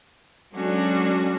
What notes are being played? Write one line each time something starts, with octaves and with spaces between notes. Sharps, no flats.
F#3 G#3 C#4 D4 F#4 A4